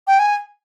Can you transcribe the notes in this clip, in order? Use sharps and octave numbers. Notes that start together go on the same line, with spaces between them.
G5
G#5